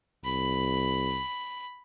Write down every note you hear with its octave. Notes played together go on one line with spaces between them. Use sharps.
C2 B5